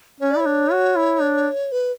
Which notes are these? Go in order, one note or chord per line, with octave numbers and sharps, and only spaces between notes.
C#4 C#5
D5
E4 C#5
D4
F#4
E4
D4
B4